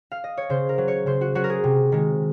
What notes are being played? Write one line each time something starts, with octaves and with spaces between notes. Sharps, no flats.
F5
D#5
C#5
C#3 C5
A#4
F#3
C#5
C#3 C5
F#4
F#3 F#4
A#4
G#4
C3
D#3 G#3